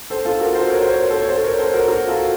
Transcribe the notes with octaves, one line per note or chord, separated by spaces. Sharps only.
A4 C5
F4 A4
F#4 A#4
A4 C5
A#4 C#5
C5
A#4 C#5
A4 C5
C#5
A4 C5
A#4 C#5
A4 C5
F#4 A#4
F#4 A#4
F4 A4